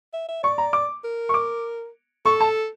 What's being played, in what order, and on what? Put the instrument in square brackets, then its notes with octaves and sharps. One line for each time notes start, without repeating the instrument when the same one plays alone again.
[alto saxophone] E5
E5
[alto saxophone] D5 [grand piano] C#6
[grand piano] A#5
D6
[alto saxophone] A#4
[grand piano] C#6
D6
[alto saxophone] A4 [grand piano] C#6
[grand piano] A5